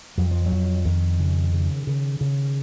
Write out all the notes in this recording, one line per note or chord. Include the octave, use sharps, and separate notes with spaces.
F2 F#3
F3
F#3
F2
F2 D#3
C#3
C#3
C#3
C#3